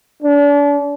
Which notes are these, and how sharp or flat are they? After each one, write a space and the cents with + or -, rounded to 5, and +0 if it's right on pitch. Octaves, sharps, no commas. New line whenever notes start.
D4 -35